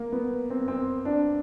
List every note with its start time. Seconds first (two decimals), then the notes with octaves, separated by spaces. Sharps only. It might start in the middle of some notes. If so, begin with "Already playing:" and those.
Already playing: A#3
0.12 B3
0.50 C4
0.68 C4
1.05 D4